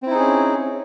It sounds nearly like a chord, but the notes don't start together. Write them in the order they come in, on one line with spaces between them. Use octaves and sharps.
C4 E4 D#4 G#4 C#4